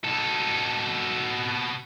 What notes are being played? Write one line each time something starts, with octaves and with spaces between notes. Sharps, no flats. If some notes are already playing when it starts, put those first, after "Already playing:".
B2 A4